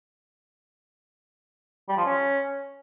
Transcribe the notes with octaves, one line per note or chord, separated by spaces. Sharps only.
G3
F3
C#4